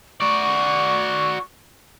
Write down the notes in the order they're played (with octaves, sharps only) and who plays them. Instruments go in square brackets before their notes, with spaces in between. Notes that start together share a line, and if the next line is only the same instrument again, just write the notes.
[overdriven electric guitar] F#4 D5 [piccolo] C#6